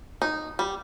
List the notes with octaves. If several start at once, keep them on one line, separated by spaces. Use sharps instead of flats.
D#4
G3